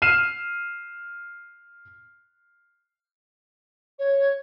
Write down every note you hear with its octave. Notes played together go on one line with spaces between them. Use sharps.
F6 C7 D#7 E7
C#5